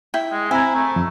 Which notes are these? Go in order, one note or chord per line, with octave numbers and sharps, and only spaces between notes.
E4 G5
G#3
C4 E4 G#5 A#5
A3
F2